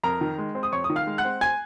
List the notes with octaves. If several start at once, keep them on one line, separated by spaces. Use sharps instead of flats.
F2 A#4 A#5
D#3
G#3
C4
D#6
F2 C#5 C#6
D#6
D#3
F5 F6
G#3
F#5 F#6
C4
G#5 G#6